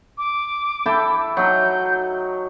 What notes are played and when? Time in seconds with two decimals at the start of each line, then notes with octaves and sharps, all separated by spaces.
0.18 D6
0.86 E4 A4 G5
1.37 F#3 D#4 G6